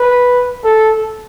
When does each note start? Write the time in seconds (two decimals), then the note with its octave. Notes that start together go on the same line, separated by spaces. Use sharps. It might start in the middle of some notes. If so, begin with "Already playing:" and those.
Already playing: B4
0.64 A4